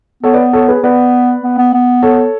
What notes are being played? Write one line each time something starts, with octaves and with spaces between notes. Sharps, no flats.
B3 A4 C#5
B4 D5
A4 C#5
G#4 B4
B3 B4 D5
B3
B3
B3
A4 C#5